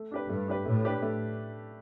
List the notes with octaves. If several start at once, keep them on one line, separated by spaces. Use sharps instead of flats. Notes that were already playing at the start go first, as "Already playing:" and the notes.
Already playing: A3
D4 G4 B4
G2 A3
D4 G4 B4
A2 A3
D4 G4 B4
A3